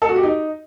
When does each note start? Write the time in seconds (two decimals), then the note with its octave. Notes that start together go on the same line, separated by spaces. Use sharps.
0.02 A4
0.09 F#4
0.16 G4
0.23 D#4